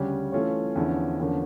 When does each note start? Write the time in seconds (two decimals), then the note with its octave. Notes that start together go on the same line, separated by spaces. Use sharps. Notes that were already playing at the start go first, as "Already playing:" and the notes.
Already playing: D2 C#3 G3 C#4 G4
0.32 E3 A3 C#4 F4 C#5
0.76 E2 D3 F3 C#4 E4
1.20 E2 D3 F3 A#3 C#4